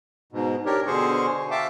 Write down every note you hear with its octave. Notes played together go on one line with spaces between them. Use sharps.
G#2 B2
D4 G4 A#4 C#5
B2 D3 G#4 C5 C#6
E5 F5 G5 A5 D6